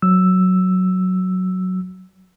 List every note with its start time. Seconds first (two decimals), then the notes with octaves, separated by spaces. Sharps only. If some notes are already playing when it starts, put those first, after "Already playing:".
0.02 F#3 E6